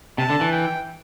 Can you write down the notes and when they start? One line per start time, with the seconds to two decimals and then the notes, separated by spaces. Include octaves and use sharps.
0.18 C3 A5
0.30 D3
0.41 E3
0.52 G5